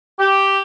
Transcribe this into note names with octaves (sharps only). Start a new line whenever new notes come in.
G4